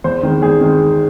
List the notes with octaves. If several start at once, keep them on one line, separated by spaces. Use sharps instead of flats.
E2 C5
D#3 G#3
E2 G#4
D#3 G#3